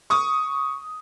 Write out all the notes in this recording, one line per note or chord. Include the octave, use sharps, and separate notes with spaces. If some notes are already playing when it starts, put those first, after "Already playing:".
C#6 D#6